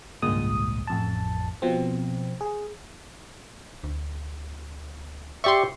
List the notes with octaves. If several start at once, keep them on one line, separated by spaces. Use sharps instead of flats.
G#1 C#2 G2 A#2 G#3 D#6
A1 F2 A5
B2 F3 C4
G#4
D2
G4 D5 E5 C6 C#6